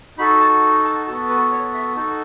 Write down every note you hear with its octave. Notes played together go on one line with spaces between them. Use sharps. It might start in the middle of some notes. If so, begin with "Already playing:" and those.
D#4 F#4 A4 B5
A5
A5
B3 F#4 A4 A5
B4
C#5
E5
D#4 F#4 A4